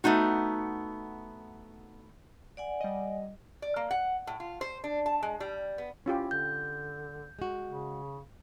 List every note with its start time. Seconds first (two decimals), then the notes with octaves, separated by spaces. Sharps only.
0.04 A3 B3 D#4 F#4
2.57 D5 F#5 G#5
2.81 G3 D#5
3.62 D5
3.76 A#3
3.91 F#5
4.27 A2
4.40 F4
4.61 C5
4.84 D4
5.06 A5
5.23 G#3
5.40 G3
5.78 B3
6.06 C#4 E4 F4 G4
6.31 D3 G6
7.39 G#3 F#4
7.68 C#3